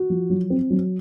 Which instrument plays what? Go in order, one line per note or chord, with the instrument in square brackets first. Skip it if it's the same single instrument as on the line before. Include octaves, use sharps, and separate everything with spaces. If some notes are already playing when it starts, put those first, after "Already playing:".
Already playing: [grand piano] F#4
F3
F#3
C4
F#3